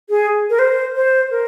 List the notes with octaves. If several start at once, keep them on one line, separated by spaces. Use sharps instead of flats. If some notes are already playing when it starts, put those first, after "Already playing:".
G#4
A#4
C5
C5
A#4